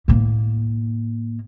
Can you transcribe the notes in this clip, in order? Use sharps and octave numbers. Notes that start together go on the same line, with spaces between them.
A2 A#3